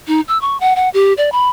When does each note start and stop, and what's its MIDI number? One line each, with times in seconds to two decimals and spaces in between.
0.07 0.21 63
0.28 0.38 88
0.41 0.59 85
0.60 0.74 78
0.76 0.89 78
0.94 1.13 67
1.17 1.32 74
1.32 1.50 83